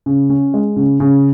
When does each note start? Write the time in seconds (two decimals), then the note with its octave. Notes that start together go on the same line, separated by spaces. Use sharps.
0.06 C#3
0.30 C#4
0.54 G#3
0.76 C#3
1.00 C#3